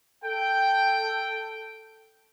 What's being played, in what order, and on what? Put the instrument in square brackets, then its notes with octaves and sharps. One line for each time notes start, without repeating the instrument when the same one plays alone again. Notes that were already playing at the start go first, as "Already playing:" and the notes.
[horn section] A4 G5